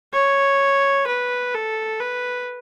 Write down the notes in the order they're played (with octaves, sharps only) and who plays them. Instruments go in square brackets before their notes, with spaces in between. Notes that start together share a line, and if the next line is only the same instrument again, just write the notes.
[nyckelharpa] C#5
B4
A4
B4